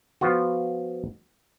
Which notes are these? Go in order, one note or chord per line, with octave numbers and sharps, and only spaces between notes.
F3 B3 F4 F#4